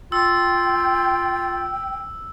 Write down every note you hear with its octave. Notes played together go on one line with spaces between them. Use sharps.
F4 G5 E6